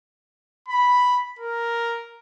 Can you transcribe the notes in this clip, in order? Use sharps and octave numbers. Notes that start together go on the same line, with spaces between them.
B5
A#4